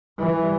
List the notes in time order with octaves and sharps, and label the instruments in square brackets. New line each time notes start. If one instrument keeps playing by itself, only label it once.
[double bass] E3 [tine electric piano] G3
[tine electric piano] G3